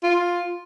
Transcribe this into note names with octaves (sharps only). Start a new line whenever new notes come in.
F4